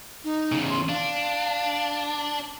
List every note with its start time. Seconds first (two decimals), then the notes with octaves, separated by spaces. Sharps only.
0.24 D#4
0.52 E2 C#3
0.70 C6
0.89 D4 F5